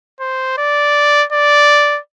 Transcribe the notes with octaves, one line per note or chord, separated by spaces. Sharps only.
C5
D5
D5